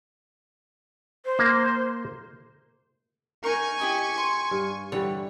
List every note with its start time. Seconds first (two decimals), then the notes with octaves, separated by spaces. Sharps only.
1.25 C5
1.39 A#3
3.44 D#4 A#4 G#5 C#6
3.80 E4 G4 D#5
4.18 C6
4.51 G2
4.92 D3 E3 G3 C#5